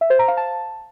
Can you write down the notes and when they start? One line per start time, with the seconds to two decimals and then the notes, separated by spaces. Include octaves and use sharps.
0.01 E5
0.10 C5
0.19 A#5
0.28 F5
0.37 A5